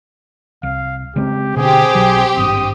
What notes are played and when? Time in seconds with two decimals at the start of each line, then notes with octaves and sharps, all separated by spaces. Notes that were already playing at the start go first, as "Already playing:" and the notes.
0.63 C2 F5
1.16 C#3 G#3 C4 G4
1.56 B2 D3 C4 G4 G#4
1.95 B1 B2 F#3
2.37 G#1 G2 D#6